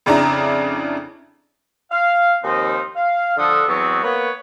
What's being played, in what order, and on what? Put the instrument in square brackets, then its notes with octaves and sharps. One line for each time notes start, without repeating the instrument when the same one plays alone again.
[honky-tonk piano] F2 C#3 D4 E4 A#5
[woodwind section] F5
D#2 F3 C4 D#4
F5
D3 F3 D4 A4 D#6
E2 F#3 B3 C4 C#6
A#3 B3 B4 C#5